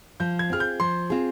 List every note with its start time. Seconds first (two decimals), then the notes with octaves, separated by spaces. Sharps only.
0.20 F3 G6
0.39 G#6
0.50 C4 F4 G#4 F6
0.60 G6
0.80 F3 C6
1.10 C4 F4 G#4